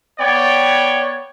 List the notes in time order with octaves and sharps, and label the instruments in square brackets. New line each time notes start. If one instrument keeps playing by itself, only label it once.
[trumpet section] B3 C#5 D5 G5